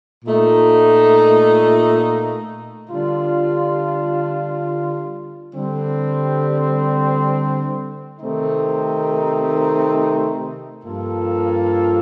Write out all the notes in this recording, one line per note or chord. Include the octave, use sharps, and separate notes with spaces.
A#2 A3 D#4
D3 G3 D4 F4
D3 G3 C4
C3 D#3 A3 C4 D#4
G2 F3 A#3 F4 A4